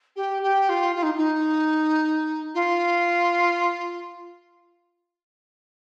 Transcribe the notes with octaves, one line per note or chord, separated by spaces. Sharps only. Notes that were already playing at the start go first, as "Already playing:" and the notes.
G4
G4
F4
F4
D#4
D#4
F4